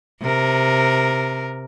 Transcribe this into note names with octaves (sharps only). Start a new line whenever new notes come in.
C3 A#4